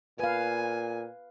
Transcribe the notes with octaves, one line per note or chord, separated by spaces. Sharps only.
A#2 B4 F5 G#5